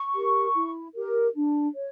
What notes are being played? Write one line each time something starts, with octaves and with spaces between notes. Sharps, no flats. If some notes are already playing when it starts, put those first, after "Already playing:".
Already playing: C#6
G4 A#4
E4
G4 A#4
D4
C#5